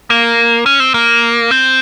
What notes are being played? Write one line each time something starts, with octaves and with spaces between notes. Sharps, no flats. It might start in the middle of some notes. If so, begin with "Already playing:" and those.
A#3
C#4
C4
A#3
C4